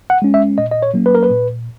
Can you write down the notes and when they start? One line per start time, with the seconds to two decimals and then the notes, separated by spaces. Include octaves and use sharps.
0.10 F#5
0.22 G#3 C#4
0.34 E5
0.58 A#2 D#5
0.71 D#5
0.83 C#5
0.94 F#3 A#3 C#4
1.06 B4
1.15 A#4
1.23 B4
1.30 A#2